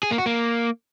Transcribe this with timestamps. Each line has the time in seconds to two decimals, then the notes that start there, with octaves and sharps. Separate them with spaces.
0.03 G#4
0.11 A#3
0.18 F#4
0.26 A#3